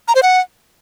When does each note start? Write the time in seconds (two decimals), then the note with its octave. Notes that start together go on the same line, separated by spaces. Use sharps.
0.08 A#5
0.15 C5
0.23 F#5